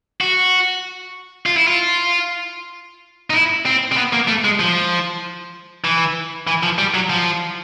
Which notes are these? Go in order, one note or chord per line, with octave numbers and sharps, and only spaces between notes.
F#4
F4
E4
F4
D#4
E4
C4
C4
B3
A#3
A3
G#3
F3
E3
E3
F3
G3
F#3
F3